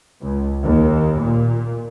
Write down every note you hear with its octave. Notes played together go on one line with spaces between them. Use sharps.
C#2
D#2
A#2